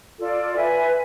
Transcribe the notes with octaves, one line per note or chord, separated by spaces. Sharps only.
F4 A4 D5
B4 E5 G#5